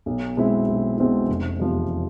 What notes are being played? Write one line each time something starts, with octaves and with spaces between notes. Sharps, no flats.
B1
B2 G#3 C4 E4
B1
B2 G#3 C4 E4
F1
E2 C3 F3